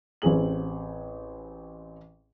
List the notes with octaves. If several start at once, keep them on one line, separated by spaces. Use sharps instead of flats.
A1 C4 G#4 F#7